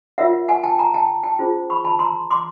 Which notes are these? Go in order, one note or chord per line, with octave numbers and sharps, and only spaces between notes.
F4 A#4 C#5 E5 F#5
F#5 G#5
G5 A5
G#5 A#5
G5 A5
G5 A5
C#4 F4 G#4 C5
B5 C#6
A5 B5
A#5 C6
C6 D6